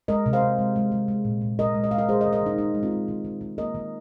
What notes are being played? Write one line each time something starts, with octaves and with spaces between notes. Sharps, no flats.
G#3 A#4 D#5
C3
C5 F5
C3
G#3
G#3
G#3
G#3
A#2
A#2
G#3 A#4 D#5
G#3
D#5
G#3 F5
A#4 D#5
G#3 G#4 C5
A#4 D#5
D#3
A#4 D#5
D#3 D#4
G#3 D#4
G#3
C4 F4
G#3
D#3
D#3
D#3
A#3 A#4 D#5
D#3